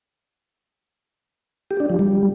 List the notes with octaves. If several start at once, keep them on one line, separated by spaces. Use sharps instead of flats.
G4
D4
F3
G3